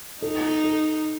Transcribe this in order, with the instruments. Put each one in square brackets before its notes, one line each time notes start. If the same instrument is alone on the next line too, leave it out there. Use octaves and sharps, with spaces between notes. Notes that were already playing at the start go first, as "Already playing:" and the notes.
[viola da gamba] D#4 [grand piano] A4
[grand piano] A4